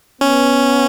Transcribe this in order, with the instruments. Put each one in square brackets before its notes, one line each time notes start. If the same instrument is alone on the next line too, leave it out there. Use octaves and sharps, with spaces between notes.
[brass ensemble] B3 [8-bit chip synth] C#4